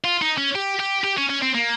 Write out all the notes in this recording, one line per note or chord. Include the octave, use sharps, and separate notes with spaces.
F4
D#4
C#4
G4
G4
G4
C#4
C#4
C4
A#3